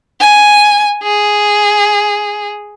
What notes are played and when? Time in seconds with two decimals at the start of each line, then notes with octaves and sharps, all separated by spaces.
0.20 G#5
1.03 G#4